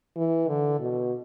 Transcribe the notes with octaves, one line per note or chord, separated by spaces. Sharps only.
E3
D3
B2